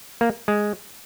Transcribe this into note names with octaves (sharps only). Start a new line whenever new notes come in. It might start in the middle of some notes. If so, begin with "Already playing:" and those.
A#3
G#3